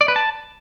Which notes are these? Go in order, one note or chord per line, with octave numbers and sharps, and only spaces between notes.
D5
B4
A5